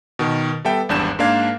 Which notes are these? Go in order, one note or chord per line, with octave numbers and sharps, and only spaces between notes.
B2 D#3
G3 B3 A4 E5 G5
G#1 E2 G2 D4 G6 E7
G#2 A#3 D4 F5 G#6